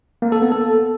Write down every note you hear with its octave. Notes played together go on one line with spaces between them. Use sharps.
A#3
A4
B3
A4